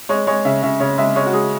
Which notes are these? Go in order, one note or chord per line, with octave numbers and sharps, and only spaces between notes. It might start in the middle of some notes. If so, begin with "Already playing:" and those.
G#3 C#5
G#3 C#5
C#3 E5
C#3 E5
C#3 C#5
G#3 E5
G#3 C#5
F#4
G#3 G#4